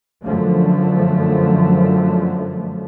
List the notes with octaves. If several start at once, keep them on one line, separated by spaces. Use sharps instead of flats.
F#2 D3 F3 A3